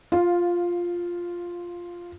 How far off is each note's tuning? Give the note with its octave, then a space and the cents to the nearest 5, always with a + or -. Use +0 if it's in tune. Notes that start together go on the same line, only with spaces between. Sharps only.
F4 +0 F5 +15